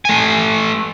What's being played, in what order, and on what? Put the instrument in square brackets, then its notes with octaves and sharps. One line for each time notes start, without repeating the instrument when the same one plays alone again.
[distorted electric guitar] A3 G#5